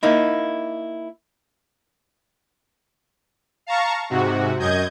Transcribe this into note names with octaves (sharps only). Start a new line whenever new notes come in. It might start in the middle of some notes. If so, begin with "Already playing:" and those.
A#3 D#4 E4
F5 A5 A#5 C#6
G#2 C3 F#4
F#2 D#5 G6 G#6